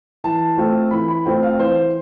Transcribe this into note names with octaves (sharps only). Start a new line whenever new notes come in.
E3 A5
A3 C4 F4
E3 B5
B5
A3 C4 F4 G5
F5
E3 C5